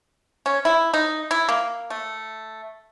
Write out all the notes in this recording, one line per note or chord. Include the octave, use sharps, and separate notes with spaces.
C#4
E4
D#4
E4
A#3
A3